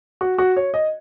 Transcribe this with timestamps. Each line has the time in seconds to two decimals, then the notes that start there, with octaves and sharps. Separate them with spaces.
0.21 F#4
0.38 F#4
0.57 C#5
0.74 D#5